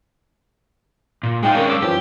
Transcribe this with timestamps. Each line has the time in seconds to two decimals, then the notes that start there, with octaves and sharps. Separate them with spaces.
1.23 A#2
1.43 G#3 D#4 G#4 F5 G5
1.55 G#3 C#4 D4 A#4
1.70 D6 E6
1.82 F#2 E3 F3 G4 C#5